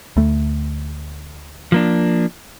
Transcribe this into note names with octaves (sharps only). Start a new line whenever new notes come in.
D2 A3
F3 A#3 D4